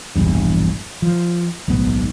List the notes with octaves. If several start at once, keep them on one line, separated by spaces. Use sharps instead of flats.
E1 A#1 E2 G2
F3
D1 B1 G#2 B3